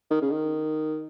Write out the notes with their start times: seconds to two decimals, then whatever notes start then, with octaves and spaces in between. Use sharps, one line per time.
0.11 D#3
0.22 C#3
0.32 D#3